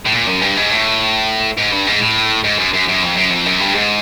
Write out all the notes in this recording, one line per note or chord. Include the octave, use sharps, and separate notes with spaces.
A2
A#2
F#2
G2
G#2
A2
G#2
G2
G#2
A2
G#2
F#2
F#2
F#2
F2
F#2
F2
F#2
G2
G#2